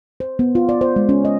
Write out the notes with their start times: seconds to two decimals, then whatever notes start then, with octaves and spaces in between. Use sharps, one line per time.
0.20 C5
0.39 B3
0.55 F4
0.69 D5
0.81 C5
0.96 G#3
1.09 C#4
1.25 D#5